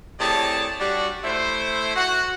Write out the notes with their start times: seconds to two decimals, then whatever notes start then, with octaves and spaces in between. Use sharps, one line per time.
0.20 A2 C3 G#4 C#5 D5 A5
0.79 G3 D4 F#4
1.24 A3 E4 C5
1.96 F#4 F#5